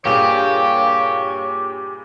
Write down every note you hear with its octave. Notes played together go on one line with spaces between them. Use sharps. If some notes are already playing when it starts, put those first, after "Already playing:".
G2 A#2 A#3 G4 G#4 C#5